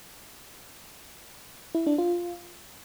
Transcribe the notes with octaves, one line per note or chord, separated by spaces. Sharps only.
E4
D4
F4